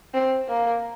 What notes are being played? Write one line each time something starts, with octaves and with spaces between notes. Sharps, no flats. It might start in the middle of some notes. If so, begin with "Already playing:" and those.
C4
A#3